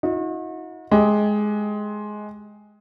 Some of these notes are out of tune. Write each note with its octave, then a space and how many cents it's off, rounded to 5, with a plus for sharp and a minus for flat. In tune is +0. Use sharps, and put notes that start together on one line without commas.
D#4 +40 F#4 -40
G#3 +15 G4 +25